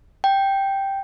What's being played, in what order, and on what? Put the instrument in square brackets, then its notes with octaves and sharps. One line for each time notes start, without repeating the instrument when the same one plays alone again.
[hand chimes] G5